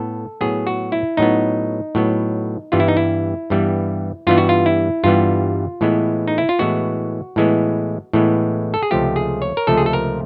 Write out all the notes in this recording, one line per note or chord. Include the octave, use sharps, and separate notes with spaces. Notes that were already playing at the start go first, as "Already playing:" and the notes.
Already playing: A2 B3 A4
A2 F#3 B3 G#4
F#4
E4
A2 F#3 B3 D#4
A2 F#3 B3
G2 E3 G3 B3 F4
E4
D#4
E4
G2 E3 G3 B3
G2 E3 G3 B3 F4
F#4
F4
E4
G2 E3 G3 B3 F4
A2 E3 G#3 B3
D#4
E4
F4
A2 E3 G#3 B3 F#4
A2 E3 G#3 B3
A2 E3 G#3 B3
A4
G#4
C#2 C3 F3 A3 G4
G#4
C#5
A#4
C#2 C3 F3 A3 A4
G#4
A4
A#4